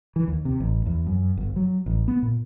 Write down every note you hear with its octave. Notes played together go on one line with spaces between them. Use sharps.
E3
D#2
C3
A1
E2
F#2
G1
F#3
A1
B3
A#2